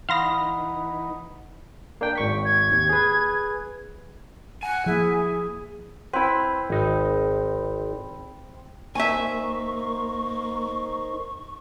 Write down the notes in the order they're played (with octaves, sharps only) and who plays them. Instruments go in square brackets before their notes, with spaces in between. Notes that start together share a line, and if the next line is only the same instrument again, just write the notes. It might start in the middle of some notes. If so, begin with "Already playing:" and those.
[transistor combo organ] E3 D#4 [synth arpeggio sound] F5 C6 A#6 [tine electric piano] F#5 B5 D#6
[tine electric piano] A#3 D4 G5
G#1 C#6 B6
[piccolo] G#6
[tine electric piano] D#2
G#4 B4
[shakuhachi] F#5 [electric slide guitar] G#5
[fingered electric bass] F3 A#3 [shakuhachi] E4 [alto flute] G#4
[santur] C4 B5 [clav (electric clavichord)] E4 B4
[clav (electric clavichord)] G#1 D#4
[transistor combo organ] A#3 [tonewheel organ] D#4 A#4 C5 [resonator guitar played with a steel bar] E5 G#5 [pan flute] C#6